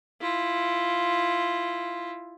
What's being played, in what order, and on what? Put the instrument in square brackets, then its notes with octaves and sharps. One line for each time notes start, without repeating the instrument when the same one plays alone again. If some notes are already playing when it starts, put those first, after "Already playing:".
[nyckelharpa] E4 F4